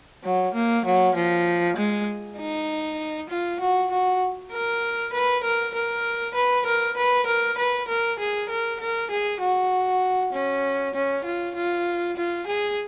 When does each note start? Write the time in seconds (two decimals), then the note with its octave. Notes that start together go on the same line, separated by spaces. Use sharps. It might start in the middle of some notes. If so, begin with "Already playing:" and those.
0.24 F#3
0.54 A#3
0.86 F#3
1.15 F3
1.77 G#3
2.38 D#4
3.30 F4
3.60 F#4
3.91 F#4
4.52 A#4
5.13 B4
5.44 A#4
5.74 A#4
6.35 B4
6.66 A#4
6.97 B4
7.27 A#4
7.58 B4
7.88 A#4
8.19 G#4
8.49 A#4
8.80 A#4
9.11 G#4
9.41 F#4
10.33 C#4
10.94 C#4
11.24 F4
11.55 F4
12.16 F4
12.47 G#4